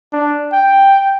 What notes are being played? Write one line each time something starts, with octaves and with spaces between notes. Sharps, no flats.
D4
G5